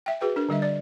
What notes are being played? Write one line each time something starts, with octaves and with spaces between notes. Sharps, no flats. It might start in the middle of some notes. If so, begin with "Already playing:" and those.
E5 G5
F#4 G#4 B4 G5
D4 A#4
D3 G3 D#5 E5
D5